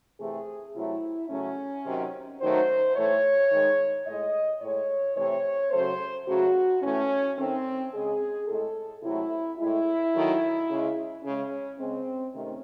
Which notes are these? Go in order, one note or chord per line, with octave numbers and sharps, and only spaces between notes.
C3 E3 A3 G#4
C3 F#3 A3 E4
C#3 F#3 A3 C#4
C3 D#3 F#3
D#3 F#3 A3 C5
A2 E3 A3 C#5
D#3 G#3
A2 G#3 D#5
A2 G#3 C#5
C3 E3 A3 C#5
C#3 F#3 A3 C5
C#3 F#3 A3 F#4
A2 E3 A3 C#4
D#3 A3 C4
C#3 G#3 G#4
A2 G#3 A4
C3 F#3 A3 E4
A2 G#3 E4
D#3 F#3 A3
C#3 G#3
C#3 G#3 C#4
C#3 G#3 C4
C3 D#3 A3 C#4